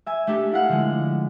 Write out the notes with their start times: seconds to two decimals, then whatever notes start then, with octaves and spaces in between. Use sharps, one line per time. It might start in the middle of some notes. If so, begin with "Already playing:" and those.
0.06 E5 G#5
0.27 A3 D4 G4 A4
0.52 E4 F5 F#5
0.69 D3 F3 G#3